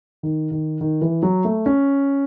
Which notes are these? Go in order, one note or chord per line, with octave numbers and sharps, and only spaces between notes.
D#3
D#3
D#3
E3
F#3
A3
C#4